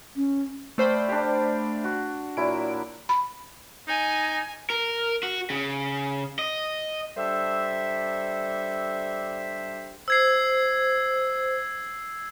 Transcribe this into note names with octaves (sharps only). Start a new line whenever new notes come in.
C#4
A3 C5 D5 F5 G5 B5
D4 G4
F#4
A#2 F#3 E4 D7
B5
D#4 G#5
A#4
F#4
C#3
D#5
G3 D4 G4 A4 C5 E5
C5 E6 G#6 C7